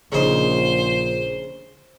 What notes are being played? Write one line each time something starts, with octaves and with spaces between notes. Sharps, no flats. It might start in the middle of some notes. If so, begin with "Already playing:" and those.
A#1 C#3 D#4 C5